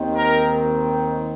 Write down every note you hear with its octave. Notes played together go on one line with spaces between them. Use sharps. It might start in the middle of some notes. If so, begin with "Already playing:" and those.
Already playing: D#2 D#3 C4
A#4